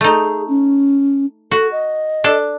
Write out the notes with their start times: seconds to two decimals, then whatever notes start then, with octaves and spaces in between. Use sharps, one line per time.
0.01 A3 D#4 G#4
0.48 C#4
1.51 F#4 A4
1.72 D#5
2.24 D4 A4